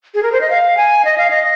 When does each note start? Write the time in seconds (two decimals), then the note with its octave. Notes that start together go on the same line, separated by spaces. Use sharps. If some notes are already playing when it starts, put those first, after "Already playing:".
0.14 G#4
0.23 A#4
0.32 C5
0.41 D#5
0.50 F5
0.77 G#5
1.05 D#5
1.18 F5
1.30 D#5